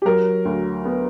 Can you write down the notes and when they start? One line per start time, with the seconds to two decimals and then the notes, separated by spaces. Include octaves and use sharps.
0.02 G4
0.05 F#3 A#4
0.45 D2
0.85 B3